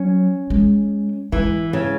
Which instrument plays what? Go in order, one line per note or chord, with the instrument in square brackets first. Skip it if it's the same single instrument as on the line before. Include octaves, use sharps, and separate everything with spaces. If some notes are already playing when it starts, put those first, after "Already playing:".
Already playing: [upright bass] F#3 [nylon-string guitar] C#4
[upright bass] G#3
[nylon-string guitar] E3 [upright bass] G#3
[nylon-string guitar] C#3